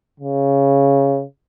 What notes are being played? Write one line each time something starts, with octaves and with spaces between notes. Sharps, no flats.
C#3